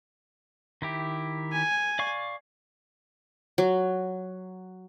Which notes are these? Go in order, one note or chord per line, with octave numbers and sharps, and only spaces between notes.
D#3 E4 G4
G#5
D5 F5 C#6
F#3